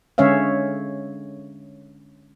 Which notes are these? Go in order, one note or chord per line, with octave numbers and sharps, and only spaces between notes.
D3 G#3 C#4 C#5 E5 F5